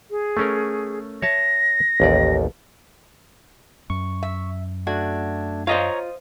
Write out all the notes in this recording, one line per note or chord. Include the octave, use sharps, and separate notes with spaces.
G#4
A3 C#4 A#4
C#5 E5 A5 A#6
A1 D#2 D5
F#2 C#6
E5
A3 D4 F#4 G#6
F4 C5 C#5 D#5 F5 A#5